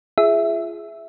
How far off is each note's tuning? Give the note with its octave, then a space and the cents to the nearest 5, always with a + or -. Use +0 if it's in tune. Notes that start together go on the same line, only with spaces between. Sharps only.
F4 -30 G#4 +5 E5 +0